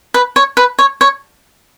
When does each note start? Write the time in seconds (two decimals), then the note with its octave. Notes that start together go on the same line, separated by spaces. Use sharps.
0.14 B4
0.36 C#5
0.57 B4
0.79 C#5
1.01 C#5